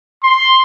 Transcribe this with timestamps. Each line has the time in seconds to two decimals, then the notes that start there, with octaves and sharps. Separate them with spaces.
0.23 C6